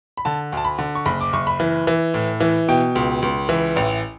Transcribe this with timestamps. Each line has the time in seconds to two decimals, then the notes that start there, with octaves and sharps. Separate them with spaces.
0.17 B5
0.25 D3 A5
0.52 D2 A5
0.65 B5
0.78 D3
0.95 C#6
1.05 F#1 B5
1.21 D6
1.33 F#1 C#6
1.47 B5
1.60 E3
1.87 E3
2.14 A2
2.41 E3
2.68 B2 G5
2.95 C#2
3.22 C#2
3.49 E3
3.76 A1